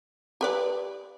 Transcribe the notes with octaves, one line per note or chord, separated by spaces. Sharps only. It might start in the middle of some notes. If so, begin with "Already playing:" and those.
G4 B4 D5